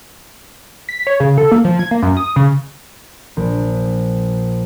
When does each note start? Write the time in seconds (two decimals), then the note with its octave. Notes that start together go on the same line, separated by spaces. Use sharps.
0.89 B6
1.07 C#5
1.20 C#3
1.38 A4
1.51 A#3
1.65 F3
1.79 G#6
1.91 A#3
2.02 F#2
2.17 D#6
2.36 C#3
3.37 A#1